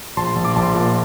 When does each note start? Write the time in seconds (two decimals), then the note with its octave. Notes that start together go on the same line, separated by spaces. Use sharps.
0.17 A#1 A5 C6
0.36 A#1
0.45 D6
0.55 A#1 A5 C6
0.75 A#2